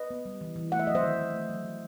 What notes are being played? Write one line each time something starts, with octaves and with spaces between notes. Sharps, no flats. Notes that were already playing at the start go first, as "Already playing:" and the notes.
Already playing: B4 D#5
B3
G3
E3
E3
A3 F#5
E5
F#3 D#5
C5 E5
D#3
D#3
A3
F#3
D#3